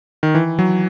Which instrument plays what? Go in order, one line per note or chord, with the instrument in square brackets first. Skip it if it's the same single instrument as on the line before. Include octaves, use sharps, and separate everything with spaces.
[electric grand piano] D#3
E3
F#3